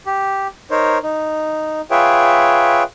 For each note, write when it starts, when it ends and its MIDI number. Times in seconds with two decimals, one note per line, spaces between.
0.06 0.47 67
0.71 0.98 63
0.71 0.98 70
0.71 0.98 72
0.71 0.98 73
1.03 1.81 63
1.91 2.83 65
1.91 2.83 68
1.91 2.83 71
1.91 2.83 73
1.91 2.83 76
1.91 2.83 79